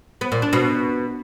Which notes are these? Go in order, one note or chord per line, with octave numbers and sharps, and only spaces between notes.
B3
A#2
D4
B2